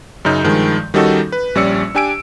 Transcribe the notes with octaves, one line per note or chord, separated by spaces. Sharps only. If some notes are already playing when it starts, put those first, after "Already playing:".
F#2 C#3 D#4 G6
G2 D#3 F3 G#3
D#3 G3 C#4 D#4 F#4 A4
B4
A#1 G3 C#4 D5 E6 C#7
D4 G4 G#5 E6 D7